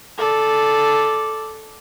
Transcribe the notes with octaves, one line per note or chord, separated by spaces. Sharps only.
A4 D5